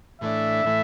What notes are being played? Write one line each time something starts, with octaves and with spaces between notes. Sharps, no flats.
A2 E3 A3 D4 E5
A2 E3 A3